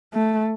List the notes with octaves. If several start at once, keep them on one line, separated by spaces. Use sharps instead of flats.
A3